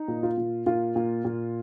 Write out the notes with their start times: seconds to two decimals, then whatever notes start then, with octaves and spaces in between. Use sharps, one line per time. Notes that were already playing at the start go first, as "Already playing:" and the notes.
Already playing: D#4
0.08 A#2
0.23 F4
0.37 A#2
0.66 A#2 F4
0.96 A#2
1.25 A#2